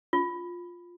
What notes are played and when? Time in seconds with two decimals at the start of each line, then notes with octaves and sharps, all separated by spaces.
0.13 F4